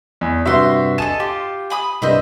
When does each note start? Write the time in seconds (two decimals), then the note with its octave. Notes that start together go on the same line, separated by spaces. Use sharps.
0.21 E2
0.46 G2 C3 F#4 C5 E5 C6
0.98 A4 D#5 G#5 A5 E7
1.20 F4 G4
1.70 G#5 B5 D#6
2.02 C2 G2 G3 C5 D#5 E5